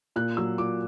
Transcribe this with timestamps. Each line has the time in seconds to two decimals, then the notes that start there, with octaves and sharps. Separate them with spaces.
0.16 A#2 F#6
0.37 F#3 E6
0.58 A#2 D6